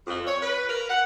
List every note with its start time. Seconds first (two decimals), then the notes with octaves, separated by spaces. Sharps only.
0.07 F2
0.26 C#5
0.42 B4
0.69 A#4
0.89 F#5